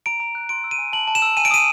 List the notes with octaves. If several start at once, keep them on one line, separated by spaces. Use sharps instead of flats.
A#5 D7
A#5
F#6
C6 D7
E6
D#7
G#5
A5 F#7
A5
E7
E6
G#5 D#7
D7
D#6 D#7